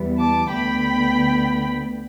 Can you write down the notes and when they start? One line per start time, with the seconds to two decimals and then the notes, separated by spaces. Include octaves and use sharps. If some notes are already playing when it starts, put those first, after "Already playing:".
Already playing: E2 E3 G3 B3
0.19 A5 D6
0.51 D2 D3 B3 G5 B5